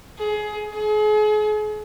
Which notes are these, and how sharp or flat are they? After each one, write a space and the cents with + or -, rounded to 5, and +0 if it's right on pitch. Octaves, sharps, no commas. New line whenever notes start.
G#4 +20
G#4 +40